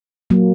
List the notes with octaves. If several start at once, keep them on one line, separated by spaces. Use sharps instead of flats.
F#3 A#3